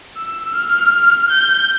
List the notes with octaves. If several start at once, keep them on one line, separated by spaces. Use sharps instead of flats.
E6
F6
G6